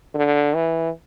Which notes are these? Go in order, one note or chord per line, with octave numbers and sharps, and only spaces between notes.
D3
E3